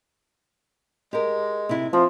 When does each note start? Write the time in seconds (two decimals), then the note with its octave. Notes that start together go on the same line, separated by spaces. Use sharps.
1.13 G#3 G4 A#4
1.69 C3 E4
1.93 F3 C4